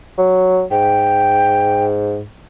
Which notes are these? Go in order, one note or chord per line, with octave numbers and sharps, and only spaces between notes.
F#3
G#2 G5